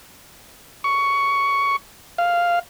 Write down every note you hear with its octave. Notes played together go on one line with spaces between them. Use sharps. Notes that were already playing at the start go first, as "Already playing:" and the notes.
C#6
F5